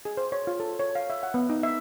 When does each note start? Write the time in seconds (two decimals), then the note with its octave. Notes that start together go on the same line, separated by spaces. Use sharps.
0.05 G#4
0.17 C5
0.32 C#5
0.47 F4
0.60 A4
0.79 C#5
0.95 F5
1.10 E5
1.23 F#5
1.34 B3
1.50 D#4
1.63 E5